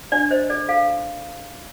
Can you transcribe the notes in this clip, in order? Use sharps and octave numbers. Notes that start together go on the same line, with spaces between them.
D4 D5
C5 D#5
A4 D5
A4 F5